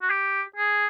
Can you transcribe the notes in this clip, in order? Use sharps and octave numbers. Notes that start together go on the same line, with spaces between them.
F#4
G4
G#4